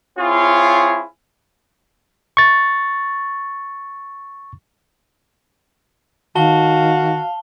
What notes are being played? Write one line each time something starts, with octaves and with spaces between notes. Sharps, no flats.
C4 E4 F4 G#4 C#5
C#6 A6
D#3 F#4 F5 A5 G7